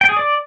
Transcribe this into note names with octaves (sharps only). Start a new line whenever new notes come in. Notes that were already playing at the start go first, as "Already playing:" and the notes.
G5
G#4
D5